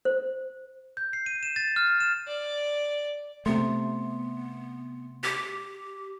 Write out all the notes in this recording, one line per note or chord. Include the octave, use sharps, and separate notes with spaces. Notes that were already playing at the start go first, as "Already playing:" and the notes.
C5
G6
C7
D#7
E7
A6
F6
E7
D5
C3 A3 B3 C6
G4